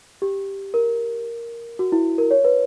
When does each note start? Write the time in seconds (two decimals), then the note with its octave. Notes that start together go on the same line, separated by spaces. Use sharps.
0.22 G4
0.74 A#4
1.79 F#4
1.92 E4
2.18 A#4
2.31 C#5
2.45 B4